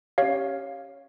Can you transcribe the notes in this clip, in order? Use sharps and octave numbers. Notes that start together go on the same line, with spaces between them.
C#4 G4 C#5 F5